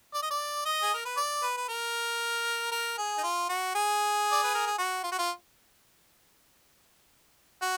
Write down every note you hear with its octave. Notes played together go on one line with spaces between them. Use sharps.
D5
D#5
D5
D#5
G#4
A#4
B4
D5
B4
B4
A#4
A#4
G#4
D#4
F4
F#4
G#4
D5
B4
A#4
G#4
F#4
F4
F#4
F4
F#4